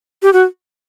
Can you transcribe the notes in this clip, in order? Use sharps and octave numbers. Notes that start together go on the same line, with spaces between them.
G4
F#4